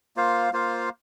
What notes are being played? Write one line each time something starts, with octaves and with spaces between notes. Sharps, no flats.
A#3 F4 C5 F5
A#3 F4 C5 F5